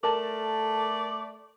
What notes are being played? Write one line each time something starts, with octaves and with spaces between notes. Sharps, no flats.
A3 A4 A#4 D5 A5